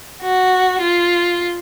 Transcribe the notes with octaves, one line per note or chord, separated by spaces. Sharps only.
F#4
F4